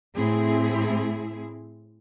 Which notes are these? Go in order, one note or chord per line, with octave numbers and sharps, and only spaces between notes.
A2 C4 E4 G#4